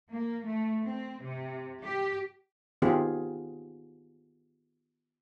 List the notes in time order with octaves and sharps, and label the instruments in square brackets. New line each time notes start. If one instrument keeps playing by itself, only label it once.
[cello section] A#3
A3
C4
C3
G4
[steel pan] D#3 B3 C4 F4 G4 G#4